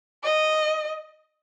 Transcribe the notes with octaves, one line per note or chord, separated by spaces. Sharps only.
D#5